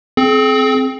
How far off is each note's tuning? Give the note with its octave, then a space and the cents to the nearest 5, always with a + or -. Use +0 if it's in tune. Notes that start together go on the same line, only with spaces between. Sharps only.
C4 +0 G#4 +45